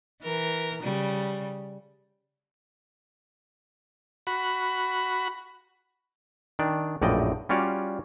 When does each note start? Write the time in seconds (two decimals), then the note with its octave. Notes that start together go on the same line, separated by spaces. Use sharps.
0.22 E3 A#4
0.82 C#3 G3
4.27 F#4 B5
6.59 D#3 D4 D5
7.02 A#1 F#2 A2 D5 D#5 G5
7.49 G3 C#4 F4 F#4 C#5 D5